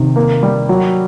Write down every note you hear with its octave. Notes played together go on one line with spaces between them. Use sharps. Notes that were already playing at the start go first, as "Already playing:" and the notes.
Already playing: C3 D#3
A#3
G3
F#3